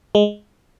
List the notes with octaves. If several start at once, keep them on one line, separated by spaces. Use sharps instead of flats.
G#3